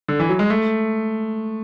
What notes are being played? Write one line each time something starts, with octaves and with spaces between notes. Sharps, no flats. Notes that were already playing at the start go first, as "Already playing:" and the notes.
D3
E3
F#3
G#3
A3